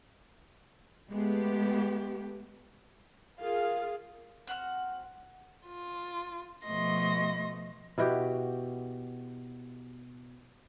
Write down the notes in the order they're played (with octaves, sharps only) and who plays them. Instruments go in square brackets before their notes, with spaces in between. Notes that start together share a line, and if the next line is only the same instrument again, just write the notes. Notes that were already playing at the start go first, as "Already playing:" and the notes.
[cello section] G#3 A3 B3 G4
[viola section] F4 G#4 [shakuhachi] A#4 [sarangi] F5
[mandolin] C4 F#4 F#5 F6
[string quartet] F4
B2 F3 A3 D#5 C6 A#6
[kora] B2 E4 F#4 G4